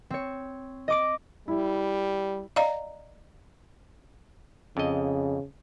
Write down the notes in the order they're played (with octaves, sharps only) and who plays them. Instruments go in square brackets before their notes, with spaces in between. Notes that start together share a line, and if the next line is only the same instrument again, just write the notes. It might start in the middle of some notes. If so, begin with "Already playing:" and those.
[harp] C4 C#5
D#5 D6 D7
[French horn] G3 [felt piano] E4
[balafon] D5 D#5 F5 A#5
[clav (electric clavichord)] F2 D#5 [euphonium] C#3